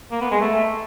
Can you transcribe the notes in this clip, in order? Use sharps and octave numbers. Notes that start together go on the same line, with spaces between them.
A#3
B3
G#3
A3